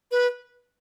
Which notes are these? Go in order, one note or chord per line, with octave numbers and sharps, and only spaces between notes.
B4